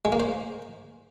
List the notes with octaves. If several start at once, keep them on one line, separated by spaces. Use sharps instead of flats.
G#3
A#3
C5